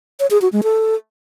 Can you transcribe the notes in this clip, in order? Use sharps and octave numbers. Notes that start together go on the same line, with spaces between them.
C#5
G#4
F#4
G#3
A4